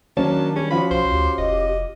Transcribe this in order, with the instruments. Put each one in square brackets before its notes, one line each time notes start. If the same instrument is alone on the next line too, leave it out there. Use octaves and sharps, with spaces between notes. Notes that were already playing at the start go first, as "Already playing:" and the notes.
[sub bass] D#3 [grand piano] F#3 A#3 C#4 [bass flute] D4 [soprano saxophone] A5
[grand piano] G3 [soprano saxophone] C#4
[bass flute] F3 [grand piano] C#4 F4 F#4 [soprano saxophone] B5
[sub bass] B1 [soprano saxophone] C5
[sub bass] D2 [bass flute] G4
[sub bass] F1 [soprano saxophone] D#5